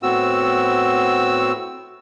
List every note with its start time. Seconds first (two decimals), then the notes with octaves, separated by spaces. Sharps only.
0.03 A2 B3 C4 F#4 E6